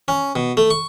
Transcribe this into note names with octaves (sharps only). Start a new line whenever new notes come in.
C#4
B2
A3
C#6